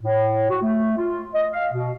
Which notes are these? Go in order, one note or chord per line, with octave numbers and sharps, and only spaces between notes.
A2
F#4
A3
F4
D#5
F5
B2